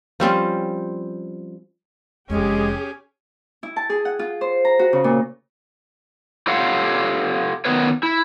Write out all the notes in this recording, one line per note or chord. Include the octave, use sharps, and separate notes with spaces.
F3 G3 C4 C#4
F1 F2 G#3 C#4 G4 G#4
E4
A5
G#4
F#5
F4
C5
A#5
F#4
C#3
A#2
F4 G4 A4 C#5 F5 F#5
D#3 B3 B4 C#5
E4